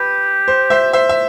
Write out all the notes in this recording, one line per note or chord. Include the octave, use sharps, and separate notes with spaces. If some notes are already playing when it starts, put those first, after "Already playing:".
Already playing: G4 B4
C5
C5 E5
C5 E5
E5